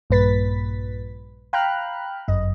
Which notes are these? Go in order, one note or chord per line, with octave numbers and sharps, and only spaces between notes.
A#1 G2 A#2 B4 A6 B6
F5 G5 A#5 B5 F6 F#6
G1 F#2 D#5